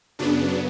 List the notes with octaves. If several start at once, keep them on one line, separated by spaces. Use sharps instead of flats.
F#2 C#3 F#3 B3 D4